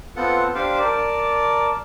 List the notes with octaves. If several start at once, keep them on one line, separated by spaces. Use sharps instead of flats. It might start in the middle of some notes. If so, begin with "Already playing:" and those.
B3 C4 F4 A4 F#5
D4 G4 C5 D5 F5
A#4 D5 A5